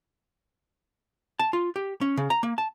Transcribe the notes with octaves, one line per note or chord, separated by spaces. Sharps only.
A5
F4
G4
C#4
C#3
A#5
A#3
A5